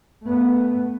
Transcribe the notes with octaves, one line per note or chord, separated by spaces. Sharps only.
A3 B3